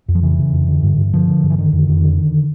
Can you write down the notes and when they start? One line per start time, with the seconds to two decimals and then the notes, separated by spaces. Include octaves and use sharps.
0.08 F2
0.15 F3
0.23 C#3 E3
0.39 C#3
0.53 F2
0.68 D3
0.83 G2
0.98 G2
1.14 D3 F3
1.28 D3
1.43 G2
1.50 E3
1.58 D3 D#3
1.73 F2
1.88 F2
2.04 D3
2.18 D3